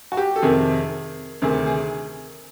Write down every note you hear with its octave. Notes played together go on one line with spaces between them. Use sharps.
F#4
G4
A4
F2 C3 D#3 G#4
D2 C3 D#3 G#4
G#4